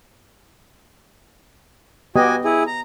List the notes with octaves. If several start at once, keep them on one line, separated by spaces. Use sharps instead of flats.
B3 F#4 G4 D#5 G#5
E4 G#4
A#5